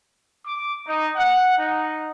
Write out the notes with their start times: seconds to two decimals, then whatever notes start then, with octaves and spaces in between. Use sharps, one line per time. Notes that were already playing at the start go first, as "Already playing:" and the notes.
0.47 D6
0.87 D#4
1.16 F#5
1.58 D#4